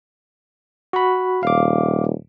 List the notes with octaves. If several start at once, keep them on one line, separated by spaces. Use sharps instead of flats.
F#4 B5
D#1 F5 D6